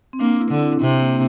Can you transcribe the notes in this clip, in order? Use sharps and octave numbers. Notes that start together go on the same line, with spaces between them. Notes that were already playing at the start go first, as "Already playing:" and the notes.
C4
A#3 D4
E4
D3
C3 C4
A#3